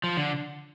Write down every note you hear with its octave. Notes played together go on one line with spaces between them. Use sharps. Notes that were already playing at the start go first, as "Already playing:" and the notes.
F3
D3